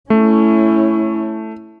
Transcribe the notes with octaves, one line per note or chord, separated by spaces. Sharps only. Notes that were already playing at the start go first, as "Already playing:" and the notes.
A3 C#4 E4